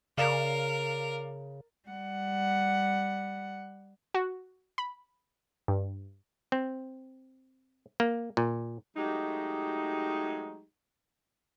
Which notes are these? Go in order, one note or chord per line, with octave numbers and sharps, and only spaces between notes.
C#3 A#4 D5 F5 E7
G3 F#5
F#4
B5
G2
C4
A#3
A#2
F#3 G#3 A3 D#4 G4